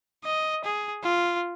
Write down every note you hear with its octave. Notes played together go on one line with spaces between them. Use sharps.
D#5
G#4
F4